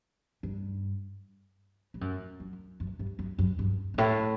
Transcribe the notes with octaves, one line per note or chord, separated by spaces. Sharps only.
G2
G2
F#2
F#2
F#2
G2
F#2
F#2
G2
G2
A2